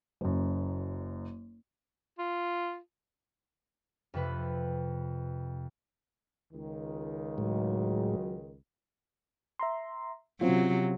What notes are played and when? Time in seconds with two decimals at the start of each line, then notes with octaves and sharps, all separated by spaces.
0.21 F#1 F#2
2.19 F4
4.14 F2 C3 B4
6.53 C#2 D#3
7.38 A2 F#3 G#3
9.59 E5 A#5 C6
10.41 C3 F#3 C4 C#4 F4